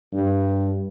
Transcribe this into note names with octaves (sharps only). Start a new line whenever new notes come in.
G2